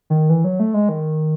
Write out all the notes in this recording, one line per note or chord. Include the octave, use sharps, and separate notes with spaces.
D#3
E3
F#3
A3
G#3
D#3